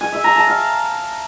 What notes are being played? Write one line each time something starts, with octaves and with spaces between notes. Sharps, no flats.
G#5
E5
A#5
A5
F5